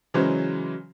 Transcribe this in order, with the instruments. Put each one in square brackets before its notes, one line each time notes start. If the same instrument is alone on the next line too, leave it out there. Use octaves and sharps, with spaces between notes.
[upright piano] C#3 E3 F#3 G#3 C#4 C5